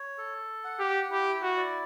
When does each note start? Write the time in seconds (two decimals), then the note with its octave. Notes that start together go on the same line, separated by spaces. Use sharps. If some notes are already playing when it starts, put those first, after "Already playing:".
Already playing: C#5
0.18 A4
0.64 F#5
0.80 G4
1.11 E4 G4
1.42 F#4
1.57 D5